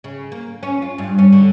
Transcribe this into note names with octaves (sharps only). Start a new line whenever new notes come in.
C#3
A#3
C#4
F4
G2
C#4
D3